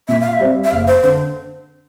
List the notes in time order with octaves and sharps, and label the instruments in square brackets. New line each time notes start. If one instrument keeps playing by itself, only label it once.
[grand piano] A#2 [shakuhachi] E5
[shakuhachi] F5
E5
[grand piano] G3 C4
[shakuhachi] E5
[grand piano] F#1 [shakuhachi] F5
[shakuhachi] C5
[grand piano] D3 [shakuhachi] C5